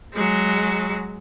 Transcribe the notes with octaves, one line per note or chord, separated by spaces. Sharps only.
F#3 G#3